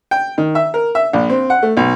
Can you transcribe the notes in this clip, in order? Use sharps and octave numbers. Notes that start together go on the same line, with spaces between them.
G5
D#3
E5
A#4
E5
A#1
C4
F#5
A3
B1